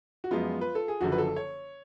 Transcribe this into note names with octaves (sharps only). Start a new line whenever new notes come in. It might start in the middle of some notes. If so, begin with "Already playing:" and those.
F#4
F#2 F3 G#3 B3 F4
B4
A4
G#4
F#1 F#2 D3 F3 F#4
B4
A4
C#5